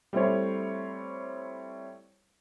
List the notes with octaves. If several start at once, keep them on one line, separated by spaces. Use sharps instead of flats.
G3 A3 C4 E4 C5 C#5